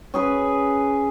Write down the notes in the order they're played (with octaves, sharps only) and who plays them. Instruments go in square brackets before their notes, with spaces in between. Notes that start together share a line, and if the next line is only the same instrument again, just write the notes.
[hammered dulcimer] C#4 G#4 B4